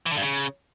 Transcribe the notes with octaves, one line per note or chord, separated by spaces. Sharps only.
E3
D3
G2
C#3